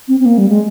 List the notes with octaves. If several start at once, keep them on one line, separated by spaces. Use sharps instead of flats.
C4
C4
A#3
G3
G#3